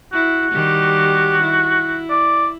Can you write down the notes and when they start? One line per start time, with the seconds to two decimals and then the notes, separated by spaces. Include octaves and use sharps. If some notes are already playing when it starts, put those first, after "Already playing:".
0.13 E4 F#4
0.52 D#3 G3 G4
1.44 E4
2.10 D5